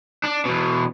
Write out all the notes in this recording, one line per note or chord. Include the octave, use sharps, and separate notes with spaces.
D4
E2 B2